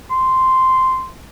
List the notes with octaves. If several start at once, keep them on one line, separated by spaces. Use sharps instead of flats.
C6